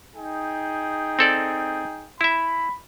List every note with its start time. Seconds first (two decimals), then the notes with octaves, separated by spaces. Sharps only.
0.15 D#4 G#4 G5
1.19 C4 A4 D5
2.21 E4 E5 B5